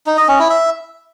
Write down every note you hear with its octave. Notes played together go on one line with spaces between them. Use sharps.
D#4
D#5
C#4
E4
E5